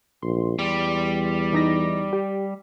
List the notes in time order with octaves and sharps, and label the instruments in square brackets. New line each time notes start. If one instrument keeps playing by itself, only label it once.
[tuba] A#1 [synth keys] C6
[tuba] E2 [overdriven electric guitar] G3
[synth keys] E3 D#4 A#6
G4